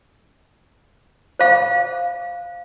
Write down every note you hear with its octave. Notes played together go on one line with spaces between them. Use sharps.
C5 F5